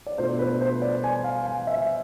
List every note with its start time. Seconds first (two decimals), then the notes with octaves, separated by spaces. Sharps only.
0.07 D5
0.18 B2 A3 D4 F4 C5
0.39 B4
0.61 C5
0.82 D5
1.04 G#5
1.24 F5
1.46 G#5
1.67 E5